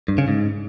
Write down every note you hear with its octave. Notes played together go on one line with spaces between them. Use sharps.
G2
C#3
G#2